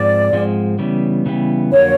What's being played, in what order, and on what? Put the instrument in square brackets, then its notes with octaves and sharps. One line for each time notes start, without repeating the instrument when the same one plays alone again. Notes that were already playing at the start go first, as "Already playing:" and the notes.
Already playing: [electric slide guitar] G#2 F3 G#3 C4 [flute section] D5
[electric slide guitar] G#2 F3 G#3 C4
C#3 E3 G3 B3
C#3 E3 G3 B3
[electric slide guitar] F2 D3 F#3 A#3 [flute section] C#5